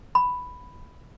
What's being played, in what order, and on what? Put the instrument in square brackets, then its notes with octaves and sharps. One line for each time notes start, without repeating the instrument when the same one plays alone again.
[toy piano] B5